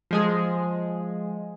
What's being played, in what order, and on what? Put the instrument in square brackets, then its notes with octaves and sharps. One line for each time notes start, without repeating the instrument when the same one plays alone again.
[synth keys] F3 G#3 G#4